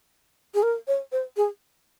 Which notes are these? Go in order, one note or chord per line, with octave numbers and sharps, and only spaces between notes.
G#4
A#4
C#5
C5
G#4